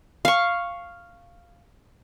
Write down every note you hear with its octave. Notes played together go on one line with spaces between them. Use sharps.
F5 C#6